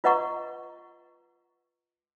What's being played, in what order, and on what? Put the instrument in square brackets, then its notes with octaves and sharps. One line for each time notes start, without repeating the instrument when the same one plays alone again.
[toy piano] F4 B4 D#5 F#5 A#5 C#6